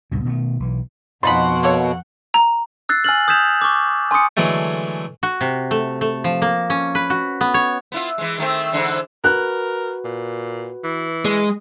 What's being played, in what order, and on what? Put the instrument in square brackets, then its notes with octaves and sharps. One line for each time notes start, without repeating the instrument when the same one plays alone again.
[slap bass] C#2 G2 B2
B2 D#3 G3 A3
B1 E3
[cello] F2 F#5 [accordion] B2 [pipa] F3 D#4 B5 [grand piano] C6
[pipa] A#3 A4 C#5
[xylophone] A#5
[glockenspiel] E6 F#6 A6 C7
G#5 E6 F6 A6 F#7
D#6 G6 G#6 B6 E7 F7
C#6 D6
G#5 C6 C#6 D#6 C#7
[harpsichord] D3 E3 F#3 G#3 A3
[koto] F#4
C3
A3
A3
F3
A#3
C#4
B4
F#4
B3
C#5
[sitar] B3 E4 F4
E3 G#3
D#3 A3 C4
G#2 D3 E3
[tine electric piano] F#4 B4 [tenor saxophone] A#4 [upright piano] F#6
[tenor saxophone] A#2
E3
[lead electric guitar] G#3